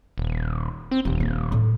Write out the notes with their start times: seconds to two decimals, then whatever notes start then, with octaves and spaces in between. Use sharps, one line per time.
0.18 D#1
0.91 C4
1.05 D#1 D#2
1.20 A#3
1.52 A2